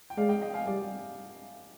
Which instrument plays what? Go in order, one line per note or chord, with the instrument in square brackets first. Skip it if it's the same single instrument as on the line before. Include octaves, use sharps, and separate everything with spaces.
[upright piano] G5
[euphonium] G#3 [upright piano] D5 F5
[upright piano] D#5 G5
D#5 G5
F5 G#5
[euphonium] G3 [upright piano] D5 F5